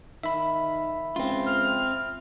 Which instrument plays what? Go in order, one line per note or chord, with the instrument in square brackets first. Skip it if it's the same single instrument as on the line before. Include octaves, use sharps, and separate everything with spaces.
[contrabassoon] D#3 [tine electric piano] E5 B5
[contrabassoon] C#2 [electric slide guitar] C4 F4
[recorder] F6